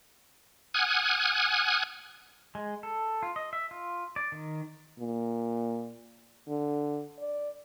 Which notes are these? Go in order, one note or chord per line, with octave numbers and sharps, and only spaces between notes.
F#5 G#5 D#6 F6 F#6 G#6
G#3
A4
F4
D#5
E5
F4
D5
D#3
A#2
D3
D5